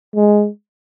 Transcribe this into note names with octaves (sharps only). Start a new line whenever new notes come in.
G#3